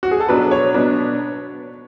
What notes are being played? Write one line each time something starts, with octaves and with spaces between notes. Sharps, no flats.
F#4
G#4
A4
B2 F#3 B3 D4 B4
C#5
B2 F#3 B3 D4